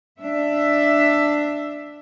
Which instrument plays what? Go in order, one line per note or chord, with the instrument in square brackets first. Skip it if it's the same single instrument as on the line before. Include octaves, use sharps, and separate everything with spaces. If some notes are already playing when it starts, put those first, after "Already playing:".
[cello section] D4 E5